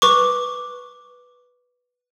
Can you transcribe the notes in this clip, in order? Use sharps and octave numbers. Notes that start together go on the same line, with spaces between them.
B4 C#6 D6